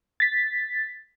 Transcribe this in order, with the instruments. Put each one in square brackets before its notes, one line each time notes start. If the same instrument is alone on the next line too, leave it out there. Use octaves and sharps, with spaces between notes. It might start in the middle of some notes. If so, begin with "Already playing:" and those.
[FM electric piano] A6 B6